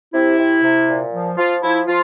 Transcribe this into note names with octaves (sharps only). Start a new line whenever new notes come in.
C3 E4
C3
C3
A#2
F3
F3 F4
F3 E4
F3 F4